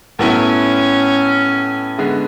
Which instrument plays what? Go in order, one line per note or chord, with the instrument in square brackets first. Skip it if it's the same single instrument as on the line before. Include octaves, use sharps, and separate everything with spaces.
[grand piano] A2 F#3 B3 E4 [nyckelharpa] C#4
[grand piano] D3 G#3 B3